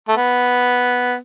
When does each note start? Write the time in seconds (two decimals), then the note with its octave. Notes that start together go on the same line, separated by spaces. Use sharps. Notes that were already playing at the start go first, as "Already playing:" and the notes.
0.08 A3
0.17 B3